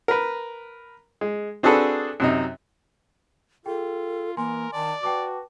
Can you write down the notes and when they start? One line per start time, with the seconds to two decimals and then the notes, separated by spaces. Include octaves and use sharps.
0.08 A#4 B4
1.21 G#3
1.63 C4 D4 F#4 G#4 A4 B4
2.20 F#2 C3 D#4
3.66 F4 G#4 A4 G5
4.37 E3 A#3 A#4 G#5 C6
4.73 D#3 D5 A5
5.03 F#4 B4 G5 A5 D6